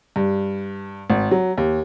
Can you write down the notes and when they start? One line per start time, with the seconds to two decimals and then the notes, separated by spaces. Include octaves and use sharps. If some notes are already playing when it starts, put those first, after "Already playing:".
0.16 G2
1.10 G#1
1.31 F#3
1.58 D#2